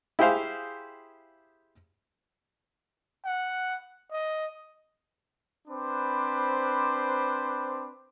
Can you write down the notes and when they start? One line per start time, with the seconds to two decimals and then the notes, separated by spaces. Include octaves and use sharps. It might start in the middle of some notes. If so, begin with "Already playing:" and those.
0.19 E4 G4 G#4 C5 F5
3.25 F#5
4.12 D#5
5.68 C4 D4 B4 C5 B5 D6